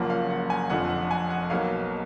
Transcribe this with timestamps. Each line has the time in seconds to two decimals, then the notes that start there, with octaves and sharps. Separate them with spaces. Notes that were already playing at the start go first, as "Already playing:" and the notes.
Already playing: F#1 F#2 F3 A#3 F#5
0.10 F5
0.30 F#5
0.50 G#5
0.70 F1 F2 D3 F3 F#5
0.90 F#5
1.11 G#5
1.30 F#5
1.50 B1 B2 F#3 A#3 F5